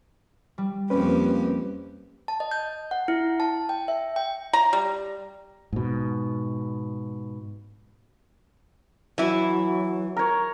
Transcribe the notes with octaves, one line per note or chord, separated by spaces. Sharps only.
G3
F2 A#3 C#4 G4 B4
A5
D#5
G6
F#5
E4
A5
G5
E5
G5
A#5
G3
G#2 B2
E3 F#3 E4
A#4 C#5